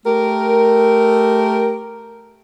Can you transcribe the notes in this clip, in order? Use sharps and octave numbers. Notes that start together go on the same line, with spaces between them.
A3 G4 A#4